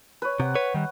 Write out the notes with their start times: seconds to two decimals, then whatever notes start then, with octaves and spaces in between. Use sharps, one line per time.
0.22 B4 C#5
0.40 C3 F#5
0.55 B4 C#5
0.74 D#3 G3